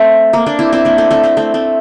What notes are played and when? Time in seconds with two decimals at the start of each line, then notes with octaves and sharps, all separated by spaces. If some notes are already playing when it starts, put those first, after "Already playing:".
Already playing: A3 C4
0.33 A#3
0.46 A#3 D4
0.59 C4 E4
0.72 C4 E4
0.85 A#3 D4
0.98 A3 C4
1.11 A3 C4
1.24 A3 C4
1.37 A3 C4
1.54 A3 C4